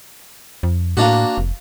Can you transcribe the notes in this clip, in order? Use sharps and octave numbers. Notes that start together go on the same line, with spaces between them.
F2
A2 A#3 D4 F#4
F1